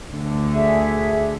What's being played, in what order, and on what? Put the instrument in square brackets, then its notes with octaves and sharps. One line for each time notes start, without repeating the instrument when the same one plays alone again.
[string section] D2 D3
[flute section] G#4 E5